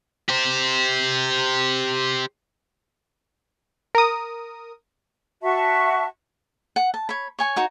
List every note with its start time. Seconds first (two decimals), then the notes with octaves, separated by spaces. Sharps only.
0.29 G4 C5
3.95 A#4 D#6
5.43 F#4 E5 A5 C#6
6.76 F#5
6.94 A5
7.09 C#5 B5
7.39 C#5 G#5 C#6
7.56 D#4 F#4 C#5